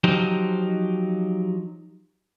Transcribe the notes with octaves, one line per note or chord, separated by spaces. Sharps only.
F3 F#3 D#4 G4